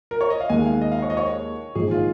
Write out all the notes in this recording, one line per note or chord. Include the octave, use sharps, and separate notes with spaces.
A#4
C#5
D#5
F5
D#2 D#3 G#3 G#5
F5
D#5
F5
C#5
D#5
C#5
A#1 G#2 D#3 G#4
F4